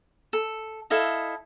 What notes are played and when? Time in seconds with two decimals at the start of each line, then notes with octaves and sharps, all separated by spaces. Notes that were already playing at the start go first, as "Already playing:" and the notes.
0.33 A4
0.90 E4 A4 D#5 F5